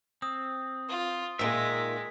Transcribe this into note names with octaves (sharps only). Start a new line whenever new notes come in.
C4 D#6
F4
A#2 D#3 G#3 E5 B6